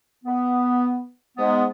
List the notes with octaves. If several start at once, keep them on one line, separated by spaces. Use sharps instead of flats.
B3
G#2 G#3 B3